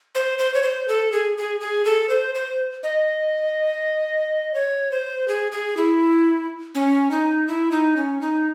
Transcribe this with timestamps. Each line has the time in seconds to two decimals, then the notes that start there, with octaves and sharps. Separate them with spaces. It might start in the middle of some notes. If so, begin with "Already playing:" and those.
0.15 C5
0.39 C5
0.54 C#5
0.63 C5
0.88 A4
1.12 G#4
1.37 G#4
1.60 G#4
1.85 A4
2.09 C5
2.35 C5
2.83 D#5
4.54 C#5
4.92 C5
5.28 G#4
5.52 G#4
5.77 E4
6.75 C#4
7.11 D#4
7.48 E4
7.71 D#4
7.96 C#4
8.21 D#4